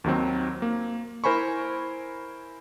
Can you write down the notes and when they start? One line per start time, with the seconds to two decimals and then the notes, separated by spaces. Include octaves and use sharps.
0.04 D#2 D#3 F#3 C4
0.62 A#3
1.24 E4 A#4 C5 G#5 B5 C#6